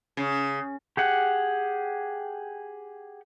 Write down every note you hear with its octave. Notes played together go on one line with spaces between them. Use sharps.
C#3
G4 G#4 F#5